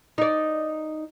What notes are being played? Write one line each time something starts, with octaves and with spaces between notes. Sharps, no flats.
D#4 D5